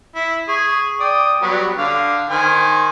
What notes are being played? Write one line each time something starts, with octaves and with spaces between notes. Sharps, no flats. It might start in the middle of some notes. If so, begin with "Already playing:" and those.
E4
G#4 C#6
D5 G5 D#6
F#3 G3 B3
D3 F5
D#3 C5 G#5